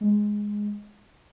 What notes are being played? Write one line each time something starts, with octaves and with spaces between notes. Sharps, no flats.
G#3